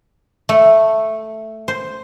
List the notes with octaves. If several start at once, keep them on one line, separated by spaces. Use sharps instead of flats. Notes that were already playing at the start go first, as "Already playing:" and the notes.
A3
C5